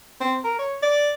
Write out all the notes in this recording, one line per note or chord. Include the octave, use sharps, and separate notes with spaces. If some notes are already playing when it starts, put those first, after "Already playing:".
C4
A#4
C#5
D5